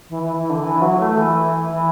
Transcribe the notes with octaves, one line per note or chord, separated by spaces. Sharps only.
E3
E3
E3
D3
E3
F#3
A3
E3
E3